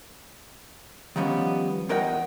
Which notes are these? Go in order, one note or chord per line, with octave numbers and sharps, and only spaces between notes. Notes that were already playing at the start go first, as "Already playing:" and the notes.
D#3 F3 G3 B3 C#4
E2 A#4 D#5 F#5 G5